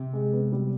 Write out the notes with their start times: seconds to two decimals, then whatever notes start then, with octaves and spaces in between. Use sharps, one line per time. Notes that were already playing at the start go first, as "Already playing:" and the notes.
Already playing: C3
0.13 G#3
0.33 B3
0.52 G3